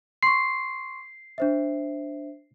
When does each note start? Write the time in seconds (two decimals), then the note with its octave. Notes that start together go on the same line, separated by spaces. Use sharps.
0.23 C6 C#6 C7
1.38 D4 C5 E5